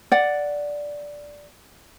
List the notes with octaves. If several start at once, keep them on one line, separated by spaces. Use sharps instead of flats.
D5 F#5